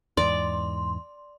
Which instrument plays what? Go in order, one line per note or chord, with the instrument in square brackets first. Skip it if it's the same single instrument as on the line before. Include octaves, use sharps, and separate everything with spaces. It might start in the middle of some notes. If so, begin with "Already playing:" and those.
[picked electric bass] E2 G#2 [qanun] D5 [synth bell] C6